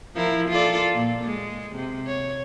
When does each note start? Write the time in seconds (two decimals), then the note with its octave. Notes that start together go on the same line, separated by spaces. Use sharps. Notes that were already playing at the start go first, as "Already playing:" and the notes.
0.15 F3 E4 A#4
0.49 F4 A4 D5
0.94 A#2
1.24 G#3
1.75 C3
2.07 C#5